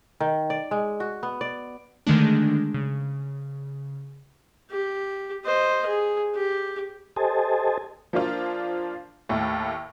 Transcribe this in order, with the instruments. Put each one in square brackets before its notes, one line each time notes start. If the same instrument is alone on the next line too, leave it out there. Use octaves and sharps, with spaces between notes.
[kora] D#3
D5
G#3
F#4
B3
D5
[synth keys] D3 D#3 G#3 A3 D4
C#3
[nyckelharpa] G4
C5 D#5
G#4
G4
[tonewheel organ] G4 A4 C5 D#5 G#5 A5
[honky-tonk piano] F3 A#3 D4 F4
D#2 A2 A3